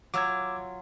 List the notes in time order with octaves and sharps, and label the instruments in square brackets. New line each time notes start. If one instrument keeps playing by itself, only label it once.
[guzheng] F#3 F4 [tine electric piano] D6 E6 G#6